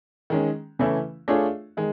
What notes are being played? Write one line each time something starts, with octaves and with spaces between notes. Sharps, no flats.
D#3 G#3 C#4
C#3 E3 A3 C#4 E4
A3 D4 F4 G#4 C#5
D#3 G#3